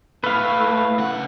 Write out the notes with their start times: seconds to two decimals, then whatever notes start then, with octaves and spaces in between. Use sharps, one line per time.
0.24 A2 A3 B4 F5
0.99 C#3 F#5